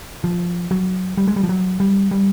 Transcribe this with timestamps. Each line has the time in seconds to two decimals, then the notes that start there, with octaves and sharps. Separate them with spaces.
0.24 F3
0.71 F#3
1.18 G3
1.27 G#3
1.36 G3
1.43 F3
1.49 F#3
1.80 G3
2.11 G3